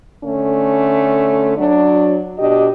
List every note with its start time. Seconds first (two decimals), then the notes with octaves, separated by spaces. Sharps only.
0.24 D3 A3 C#4
1.58 F#3 D4
2.38 B2 D4 G4 D#5